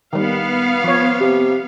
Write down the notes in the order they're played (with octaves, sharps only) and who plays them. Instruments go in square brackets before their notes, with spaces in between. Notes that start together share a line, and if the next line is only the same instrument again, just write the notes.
[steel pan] D#3 G3 [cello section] B3 F5
[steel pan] F3 C#5
[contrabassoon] C3